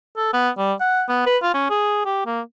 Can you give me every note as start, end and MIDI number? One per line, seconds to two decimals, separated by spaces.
0.17 0.33 69
0.33 0.49 59
0.58 0.73 55
0.81 1.04 78
1.09 1.22 59
1.26 1.37 71
1.43 1.51 65
1.54 1.66 61
1.70 2.01 68
2.06 2.26 67
2.26 2.41 58